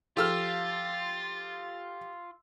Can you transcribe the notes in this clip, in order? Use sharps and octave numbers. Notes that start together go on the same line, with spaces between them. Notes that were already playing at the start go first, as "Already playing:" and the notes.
F3 F4 G4 A4 C6 E6 F6 A6